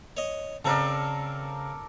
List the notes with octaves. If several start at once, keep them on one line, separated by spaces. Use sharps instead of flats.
C#5 D#5
C#3 C4 A4 A#4 C5 D5